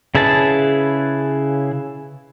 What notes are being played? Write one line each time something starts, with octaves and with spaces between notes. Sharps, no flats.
C#3 E4 G#4 B4 A5